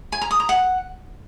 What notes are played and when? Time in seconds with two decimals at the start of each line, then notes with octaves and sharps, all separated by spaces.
0.12 G#5
0.22 A#5
0.31 D#6
0.40 A#5
0.49 F#5